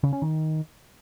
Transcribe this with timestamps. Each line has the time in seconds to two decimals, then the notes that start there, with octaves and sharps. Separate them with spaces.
0.03 C#3
0.13 C#4
0.22 D#3